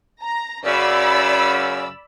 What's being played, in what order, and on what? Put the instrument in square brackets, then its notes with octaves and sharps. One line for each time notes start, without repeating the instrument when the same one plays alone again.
[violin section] A#5
[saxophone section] F#2 C#3 [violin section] D5 B5 E6